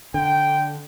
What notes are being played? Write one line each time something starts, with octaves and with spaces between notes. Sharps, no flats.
D3 G5